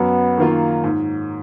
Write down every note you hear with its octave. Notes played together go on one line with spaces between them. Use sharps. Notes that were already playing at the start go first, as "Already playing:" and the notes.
Already playing: F#2 B3
D#3 A#3 F4
G#2